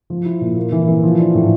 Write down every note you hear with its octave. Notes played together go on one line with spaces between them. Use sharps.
F3
E4
A#2
A#3
E3
E3
F3
D4
A2